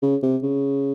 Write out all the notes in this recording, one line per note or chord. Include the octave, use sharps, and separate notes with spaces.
C#3
C3
C#3